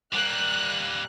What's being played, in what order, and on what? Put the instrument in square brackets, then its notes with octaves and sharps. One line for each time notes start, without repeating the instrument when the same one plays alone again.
[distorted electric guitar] G3 A#3 [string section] F#6